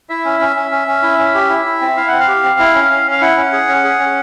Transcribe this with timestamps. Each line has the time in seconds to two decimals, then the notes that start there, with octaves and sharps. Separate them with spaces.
0.10 E4 E5
0.25 C#4
0.40 C#4
0.56 C#4
0.71 C#4
0.88 C#4
1.03 E4
1.18 C#4
1.34 G4
1.49 E4
1.66 E4
1.81 C4
1.97 E4 F5
2.08 C4 F#5
2.20 F5
2.28 G4
2.43 C4
2.59 E4
2.75 C#4
2.91 C#4
3.06 C#4
3.11 F5
3.21 E4 F#5
3.37 C#4
3.53 G#4
3.68 C#4
3.84 G#4
3.99 C#4